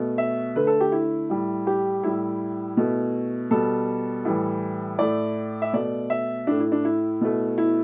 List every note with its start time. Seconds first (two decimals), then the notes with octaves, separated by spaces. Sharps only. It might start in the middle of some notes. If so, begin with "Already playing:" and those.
Already playing: B2 A3
0.18 E5
0.56 D3 A3 B4
0.67 A4
0.81 G4
0.92 E4
1.30 A2 G3
1.67 G4
2.03 A2 G3 E4
2.77 B2 A3
3.51 B2 G3 A4
4.25 A2 E3 G3
4.99 A2 A3 D5
5.62 E5
5.73 B2 A3 D5
6.10 E5
6.47 A2 A3 D4
6.60 E4
6.72 D4
6.85 E4
7.21 B2 A3
7.58 E4